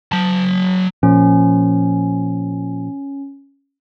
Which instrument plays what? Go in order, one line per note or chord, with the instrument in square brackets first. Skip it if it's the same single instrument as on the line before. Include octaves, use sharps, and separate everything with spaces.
[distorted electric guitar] F#3 A5
[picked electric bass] A#2 F3 [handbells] C#4